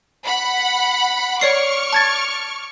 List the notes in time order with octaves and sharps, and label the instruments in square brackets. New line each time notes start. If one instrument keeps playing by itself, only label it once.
[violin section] F#5 B5
[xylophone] C#5 D5 C7 [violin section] C#6 D6 F6
[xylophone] A5 G#6 A6